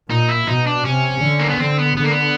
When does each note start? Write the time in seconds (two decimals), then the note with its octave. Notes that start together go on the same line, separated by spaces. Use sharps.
0.10 A#2 D#4
0.29 E4
0.47 B2 D#4
0.66 D4
0.85 C3 C#4
1.22 D3
1.40 A#3
1.49 B3
1.59 D3 C4
1.79 B3
1.97 D3 B3
2.04 A#3
2.11 B3